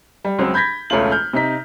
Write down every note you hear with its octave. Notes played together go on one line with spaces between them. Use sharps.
G3
C#2 F#3 C4
B5 G6 G#6 A#6 B6
E1 C#2 A3 C#4 F4 F#7
F6 G6
C3 D#4 B6